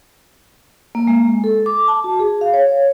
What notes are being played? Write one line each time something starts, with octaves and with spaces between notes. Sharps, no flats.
A#3
G#3
A4
D6
A5
F#4
G#4
F5
C#5